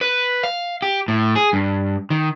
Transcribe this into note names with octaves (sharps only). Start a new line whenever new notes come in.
B4
F5
G4
A2
G#4
G2
D#3